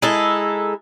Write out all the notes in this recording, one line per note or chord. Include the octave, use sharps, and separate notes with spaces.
G#3 D#4 E4 A4